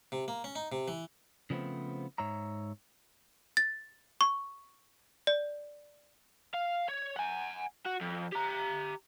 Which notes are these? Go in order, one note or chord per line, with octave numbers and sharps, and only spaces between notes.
C3
A#3
C#4
D#4
C3
E3
C#3 F3 G3 A3 B3 C4
G#2 C#5 E5 A#5
A6
C#6
D5
F5
C#5
F#5 G#5
F#4
F2
G4 A#5